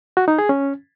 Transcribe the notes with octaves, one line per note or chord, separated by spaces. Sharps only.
F#4
D#4
G#4
C#4